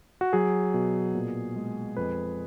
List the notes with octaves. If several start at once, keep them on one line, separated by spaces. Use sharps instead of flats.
F#4
F#3 G#4
B2
A#2
G#3
F2 B4